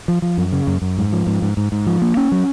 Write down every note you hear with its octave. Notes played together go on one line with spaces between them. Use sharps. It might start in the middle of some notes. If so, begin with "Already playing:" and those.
F3
F3
F#2
C#3
F#2
F#2
G#2
F3
G#2
G#2
G#2
G#2
F3
A#3
C#4
F#3